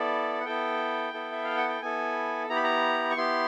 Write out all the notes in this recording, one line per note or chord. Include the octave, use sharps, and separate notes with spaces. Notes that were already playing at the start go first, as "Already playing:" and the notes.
Already playing: B3 E4 A4 D5
F#5
B3 E4 A4 G5
B3 E4 A4
E5
F5
F#5
G5
B3 E4 A4 G#5
B3 E4 G4 A#5
B5
A#5
C#6
B3 E4 G4 C6